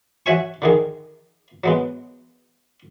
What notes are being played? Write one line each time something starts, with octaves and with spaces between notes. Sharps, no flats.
F#4 C#5 E5 G#5 C#6
D3 D#3 G#4
F#3 G#3 B3